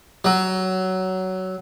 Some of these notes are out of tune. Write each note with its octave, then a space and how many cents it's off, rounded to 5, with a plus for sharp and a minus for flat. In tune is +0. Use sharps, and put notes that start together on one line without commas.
F#3 +15